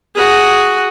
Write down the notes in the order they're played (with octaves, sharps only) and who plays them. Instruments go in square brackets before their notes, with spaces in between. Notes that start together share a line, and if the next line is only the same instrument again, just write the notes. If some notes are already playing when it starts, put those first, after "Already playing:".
[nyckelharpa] F#4 G#4